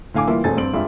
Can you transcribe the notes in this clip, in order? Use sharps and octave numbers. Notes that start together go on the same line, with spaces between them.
A2 D3 F5 G#5 D6
E3 G3 A#3 E4 F4
E1 A3 C4 G#5 A6
G2 C4 D7 F#7
G2 G3 G#3 F4 E5